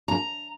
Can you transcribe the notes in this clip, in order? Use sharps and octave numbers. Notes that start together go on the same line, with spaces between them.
A#5